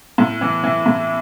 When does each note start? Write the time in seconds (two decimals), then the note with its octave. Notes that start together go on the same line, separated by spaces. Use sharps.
0.18 A2
0.41 E3
0.63 E3
0.86 A2